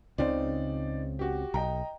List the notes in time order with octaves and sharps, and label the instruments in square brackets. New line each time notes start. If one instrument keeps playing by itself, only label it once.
[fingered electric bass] C#2 C#3 C4 [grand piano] D#4 C5 D5
[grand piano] F#4 G4
[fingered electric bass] B1 [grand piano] D#5 G5 A#5